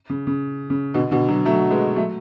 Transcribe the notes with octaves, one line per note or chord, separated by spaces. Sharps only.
C#3
C#3
C#3
B2 D3
B2 D3
D3 F#3
F#3 A3
G#3 B3
F#3 A3